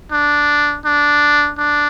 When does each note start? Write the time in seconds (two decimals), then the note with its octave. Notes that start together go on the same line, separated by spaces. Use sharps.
0.12 D4
0.85 D4
1.58 D4